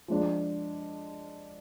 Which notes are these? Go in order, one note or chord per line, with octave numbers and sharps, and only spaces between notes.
F3 G#3 D4 F4